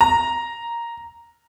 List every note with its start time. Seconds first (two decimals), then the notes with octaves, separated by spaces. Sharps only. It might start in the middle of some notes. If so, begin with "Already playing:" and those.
0.01 A#5